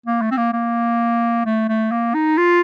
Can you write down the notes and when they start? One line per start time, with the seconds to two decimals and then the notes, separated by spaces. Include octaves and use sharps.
0.07 A#3
0.22 A3
0.31 C4
0.37 A#3
0.53 A#3
1.46 A3
1.69 A3
1.91 A#3
2.14 D#4
2.38 F4